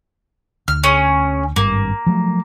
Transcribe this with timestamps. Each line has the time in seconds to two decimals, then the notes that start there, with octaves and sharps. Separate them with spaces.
0.68 D2 F6
0.83 C#4 G#4
1.56 G#1 G2 A#3
2.07 F3 F#3 A3